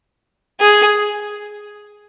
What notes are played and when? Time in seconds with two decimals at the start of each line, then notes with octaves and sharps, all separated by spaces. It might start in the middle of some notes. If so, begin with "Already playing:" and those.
0.61 G#4